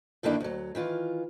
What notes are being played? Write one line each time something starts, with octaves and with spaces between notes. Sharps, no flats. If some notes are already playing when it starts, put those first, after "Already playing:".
F#2 D3 D#3 A#3 D4 E4
D2 F#3
D#3 E3 F4